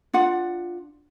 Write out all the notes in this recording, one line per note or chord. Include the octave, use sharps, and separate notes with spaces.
D4 F4 F#5